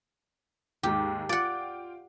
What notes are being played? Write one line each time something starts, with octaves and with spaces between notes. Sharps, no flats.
D#2 G#2 G#3 G4
F4 D5 F#5 G5